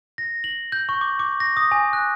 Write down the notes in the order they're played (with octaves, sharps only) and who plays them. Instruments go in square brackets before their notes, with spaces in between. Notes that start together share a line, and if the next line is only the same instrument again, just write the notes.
[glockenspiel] A#6
F#7
G6
C#6
D6
D6
A#6
D#6
G#5
F#6